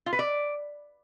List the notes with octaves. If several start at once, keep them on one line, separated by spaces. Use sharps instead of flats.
F4
B4
D5